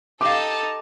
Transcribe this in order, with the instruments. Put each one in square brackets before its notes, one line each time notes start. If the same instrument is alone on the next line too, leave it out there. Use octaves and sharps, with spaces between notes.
[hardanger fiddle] D#4 [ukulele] G4 F5 [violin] A4 A5 [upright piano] D6